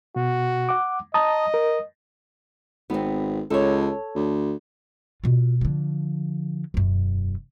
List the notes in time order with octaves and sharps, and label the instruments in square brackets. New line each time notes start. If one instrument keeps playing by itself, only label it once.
[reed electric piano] B2 [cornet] F#4
[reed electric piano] F#5 D6
[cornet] D#5 [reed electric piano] A5 A#5 D#6
[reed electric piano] A#4
[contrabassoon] G#1 [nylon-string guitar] B3 C4
[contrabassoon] C#2 [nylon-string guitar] A4 C#5
[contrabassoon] D2
[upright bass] B2 F4
D3 F3
E1 F#2